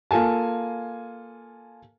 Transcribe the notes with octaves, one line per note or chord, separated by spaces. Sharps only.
A#3 F4 A4 G#5 A5